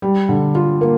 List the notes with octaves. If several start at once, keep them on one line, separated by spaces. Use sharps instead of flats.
G3
D3
F4
A#3